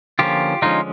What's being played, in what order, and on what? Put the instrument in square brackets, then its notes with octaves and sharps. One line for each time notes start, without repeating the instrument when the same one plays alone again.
[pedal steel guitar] D3 F3 A#3 C#4 F4 G4
D3 F3 G#3 C#4 D#4 F4